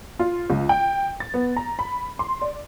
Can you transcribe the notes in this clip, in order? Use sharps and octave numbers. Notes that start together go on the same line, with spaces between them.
F4
C#2
G5
A6
B3
A#5
B5
C6
D5